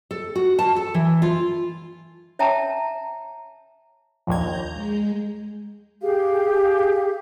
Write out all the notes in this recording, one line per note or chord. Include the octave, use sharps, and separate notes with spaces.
A4
F#4
A5
A4
E3
F4
C#5 E5 G5 A5 A#5
A#1 D#2 A#5 G6 G#6
G#3
G4 G#4 F5